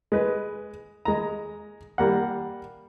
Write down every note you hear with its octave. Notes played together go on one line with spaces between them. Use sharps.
G#3 B4
G#3 A#5
G3 A#3 F#5